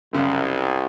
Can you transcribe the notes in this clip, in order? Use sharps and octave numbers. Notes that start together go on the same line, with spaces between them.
C2 F#2 C#3